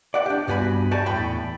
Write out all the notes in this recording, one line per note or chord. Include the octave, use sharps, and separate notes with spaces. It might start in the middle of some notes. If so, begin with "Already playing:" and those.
D5 F#5
D4 G4
C2 G2 B3 F#4 G#5 B5
F#4 G4 C#5 D5 G#5 A5
E2 A2 G5 B5